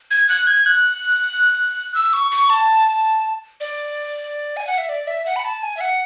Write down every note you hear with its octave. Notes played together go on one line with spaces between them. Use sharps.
G#6
F#6
G#6
F#6
E6
C#6
C#6
A5
D5
G#5
F#5
E5
D5
E5
F#5
B5
A5
G#5
E5
F#5